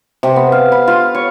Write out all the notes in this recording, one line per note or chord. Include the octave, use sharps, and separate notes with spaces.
C3
B3
F5
B5
F4
C#5